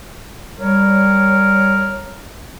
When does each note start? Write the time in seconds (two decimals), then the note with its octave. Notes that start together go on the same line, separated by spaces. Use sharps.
0.59 G3 A#4 C#5